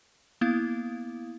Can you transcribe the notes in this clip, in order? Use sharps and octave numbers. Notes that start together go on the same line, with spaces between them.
A#3 B3 E4 F5